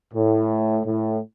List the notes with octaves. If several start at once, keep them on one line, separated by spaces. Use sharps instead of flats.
A2
A2